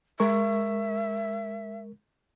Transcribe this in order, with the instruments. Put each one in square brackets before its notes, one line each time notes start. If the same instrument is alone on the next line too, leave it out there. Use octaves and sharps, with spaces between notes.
[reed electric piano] G#3 A#4 C#6 [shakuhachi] E5